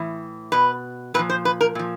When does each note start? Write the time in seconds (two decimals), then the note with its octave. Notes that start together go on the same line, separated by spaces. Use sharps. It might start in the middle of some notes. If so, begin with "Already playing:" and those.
Already playing: A2 E3
0.52 B2 B4
1.14 A#2 B4
1.19 F3
1.29 C5
1.45 B4
1.61 A#4
1.75 A#2 F3